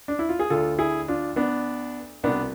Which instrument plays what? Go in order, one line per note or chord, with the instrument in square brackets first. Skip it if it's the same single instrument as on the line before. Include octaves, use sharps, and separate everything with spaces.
[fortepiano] D4
E4
F4
G#4
D2 D3 F4 A4
E4 G#4
D4 F4
B3 D4
C2 B2 B3 D4